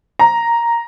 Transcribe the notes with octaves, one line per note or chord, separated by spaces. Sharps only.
A#5